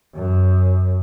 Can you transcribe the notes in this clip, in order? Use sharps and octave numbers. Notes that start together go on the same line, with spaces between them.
F#2